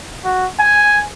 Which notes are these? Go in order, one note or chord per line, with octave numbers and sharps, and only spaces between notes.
F#4
G#5